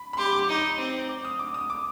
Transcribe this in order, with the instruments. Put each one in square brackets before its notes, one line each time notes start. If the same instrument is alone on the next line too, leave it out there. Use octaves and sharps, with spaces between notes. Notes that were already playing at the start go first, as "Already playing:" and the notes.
Already playing: [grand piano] B5
B5
[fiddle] G4 [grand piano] C6
[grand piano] D6
[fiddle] D#4
C4
[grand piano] D6
D#6
D6
D#6
D6